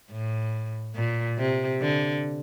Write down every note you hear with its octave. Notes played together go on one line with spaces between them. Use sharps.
A2
A#2
C3
D3